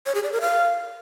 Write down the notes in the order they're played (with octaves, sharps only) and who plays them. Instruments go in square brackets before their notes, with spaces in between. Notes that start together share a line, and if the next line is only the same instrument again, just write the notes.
[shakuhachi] C#5
G#4
D5
A#4
F5